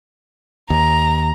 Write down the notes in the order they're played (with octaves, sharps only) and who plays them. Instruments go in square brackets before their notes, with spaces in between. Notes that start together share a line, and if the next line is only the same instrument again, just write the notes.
[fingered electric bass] D#2 [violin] A#5